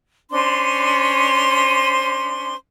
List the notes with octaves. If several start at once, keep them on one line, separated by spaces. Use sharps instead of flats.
C#4 D4 C5 C6